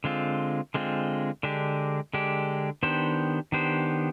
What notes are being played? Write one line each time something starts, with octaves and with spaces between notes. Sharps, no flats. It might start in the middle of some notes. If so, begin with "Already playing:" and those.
D3 G#3 C4 F4
D3 G#3 C4 F4
D3 G#3 D4 G4
D3 G#3 D4 G4
D#3 B3 D4 G4 C5
D#3 B3 D4 G4 C5